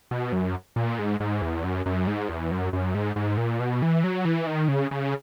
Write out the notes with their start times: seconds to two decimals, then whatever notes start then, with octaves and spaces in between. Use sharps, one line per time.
0.11 B2
0.32 F#2
0.76 A#2
0.99 G#2
1.20 G#2
1.42 E2
1.64 F#2
1.86 F#2
2.07 G#2
2.29 E2
2.51 F#2
2.73 F#2
2.95 G#2
3.16 G#2
3.37 A#2
3.60 B2
3.82 E3
4.04 F#3
4.25 E3
4.47 D#3
4.68 C#3
4.91 C#3